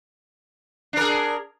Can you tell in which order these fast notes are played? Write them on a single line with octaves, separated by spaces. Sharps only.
D4 A#4 G#4